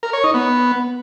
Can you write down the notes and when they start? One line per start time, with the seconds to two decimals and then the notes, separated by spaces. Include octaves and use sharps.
0.03 A#4
0.13 C#5
0.24 D#4
0.34 B3